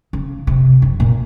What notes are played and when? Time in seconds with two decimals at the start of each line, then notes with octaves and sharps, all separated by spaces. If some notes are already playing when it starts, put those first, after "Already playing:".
0.13 C#3
0.47 C3
0.82 F#2
1.00 A#2